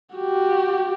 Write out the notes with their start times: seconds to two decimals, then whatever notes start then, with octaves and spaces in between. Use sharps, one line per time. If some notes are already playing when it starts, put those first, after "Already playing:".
0.16 F#4 G4